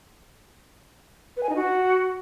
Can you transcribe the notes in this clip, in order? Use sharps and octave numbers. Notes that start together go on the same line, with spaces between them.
B4
G#5
D#4
F#4